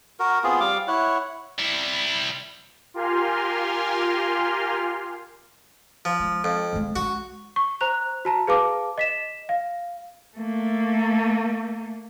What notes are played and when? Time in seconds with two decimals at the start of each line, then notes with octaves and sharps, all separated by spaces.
0.20 F#4 A#4
0.44 B3 C4 F4 G#4
0.60 G3 F5 D6
0.88 E4 C#5 F#5
1.59 G3 E4
2.94 F4 G4 A#4 G#5 C6 F6
6.05 F3
6.20 G#3
6.44 F2
6.73 C#3 G#3
6.96 G#3 C#4 F#4
7.56 C#6
7.81 C5 A#5 F#6 F7
8.25 F#4 A5 A#5
8.47 G#4 B4 F5 A5 D6
8.98 D#5 B6 E7
9.49 F5
10.38 A3 A#3